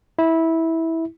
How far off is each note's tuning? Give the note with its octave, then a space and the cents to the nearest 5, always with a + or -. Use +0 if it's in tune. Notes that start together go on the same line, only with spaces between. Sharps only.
E4 -15